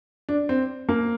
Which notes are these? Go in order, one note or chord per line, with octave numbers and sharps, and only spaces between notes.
D4
C4
A#3